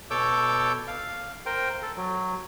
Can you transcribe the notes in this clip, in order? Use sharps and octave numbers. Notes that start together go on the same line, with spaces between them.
B2 A4 C#5 D6 E6 G6
F5
A#4 C5 G5
A4
F#3